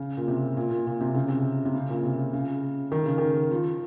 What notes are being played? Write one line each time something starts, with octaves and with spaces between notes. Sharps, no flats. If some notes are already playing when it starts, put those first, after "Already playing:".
Already playing: C#3
A#2
C3
A#2
A#2
A#2
C3
C#3
C3
C3
C#3
A#2
C3
C#3
D#3
C#3
D#3
F3